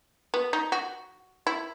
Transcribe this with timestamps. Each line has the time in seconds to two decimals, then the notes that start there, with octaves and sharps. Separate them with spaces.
0.34 B3
0.53 D#4
0.72 F#4
1.47 E4